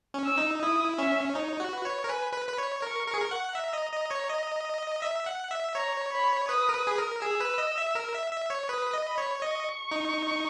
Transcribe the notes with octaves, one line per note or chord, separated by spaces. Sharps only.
C#4
E6
D#4
E4 D#6
C#4 E5
D#4 C#5
F#4
B4
C#5
A#4
B4 G#5
B4
B4 B5
C#5
A#4 C#6
A#4
G#4
A#4
F#5
E5 A#5
D#5
D#5
C#5
D#5
E5
F#5
E5
C#5 A#5
B5
B4 D#6
A#4
B4
G#4
A#4
G#4 E6
B4
D#5
E5
A#4
E5
E5
C#5
B4 D#6
D#5
B5
C#5
D#5 C#6
D#4